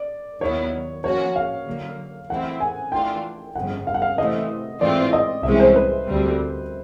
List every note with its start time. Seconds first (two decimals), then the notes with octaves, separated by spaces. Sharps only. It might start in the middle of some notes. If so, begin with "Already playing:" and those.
Already playing: D5
0.41 D#2 D#3 F#3 B3 E4 C#5
1.04 F3 A#3 C#4 F#4 C#5
1.36 F5
1.66 D3 F#3 A#3
2.30 E3 A3 C4 E4 F#5
2.60 G#5
2.92 E3 A3 D4 F4 G5
3.55 G1 F2 C#3 F#5
3.87 F5
3.94 F#5
4.02 F5
4.18 C3 E3 A3 D#5
4.80 G#2 E3 A3 C4 F4 D5
5.13 D#5
5.43 C2 C3 E3 G#3 C#4 E5
5.60 C5
5.76 B4
6.07 D2 D3 G3 C4